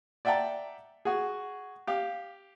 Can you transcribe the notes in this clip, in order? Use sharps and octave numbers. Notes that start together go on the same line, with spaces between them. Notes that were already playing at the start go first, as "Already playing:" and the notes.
D5 E5 F#5 G5 A5 A#5
F#4 G#4
G4 F5